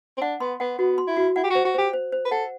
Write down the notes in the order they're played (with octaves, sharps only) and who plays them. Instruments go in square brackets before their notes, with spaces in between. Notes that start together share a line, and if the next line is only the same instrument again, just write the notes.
[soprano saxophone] C4
[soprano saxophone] D4 [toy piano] F#5
[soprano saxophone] B3 [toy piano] C6
[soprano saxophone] B3 [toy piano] F#5
[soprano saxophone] B3 [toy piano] F#4
[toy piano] C6
[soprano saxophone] E4
[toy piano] F#4
[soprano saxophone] E4 [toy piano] F#5
[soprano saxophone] G4
[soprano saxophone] F#4 [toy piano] C5
[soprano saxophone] F#4
[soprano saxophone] G4 [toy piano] C5
[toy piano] C5
C5
[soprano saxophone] B4
[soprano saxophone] A4 [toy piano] F#5